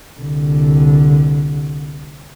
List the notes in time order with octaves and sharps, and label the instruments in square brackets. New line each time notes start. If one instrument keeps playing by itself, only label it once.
[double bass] C2 D3